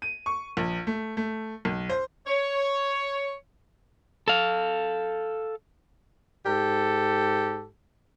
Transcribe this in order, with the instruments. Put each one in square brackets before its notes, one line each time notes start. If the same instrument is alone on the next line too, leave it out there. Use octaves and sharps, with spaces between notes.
[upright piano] D#7
C#6
A#1
A3
A3
B1
C5
[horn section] C#5
[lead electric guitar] A4 F5
[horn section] G#2 G4 A4